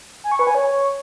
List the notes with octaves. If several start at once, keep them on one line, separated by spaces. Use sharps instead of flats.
G#5
C#6
B4
G#5
C#5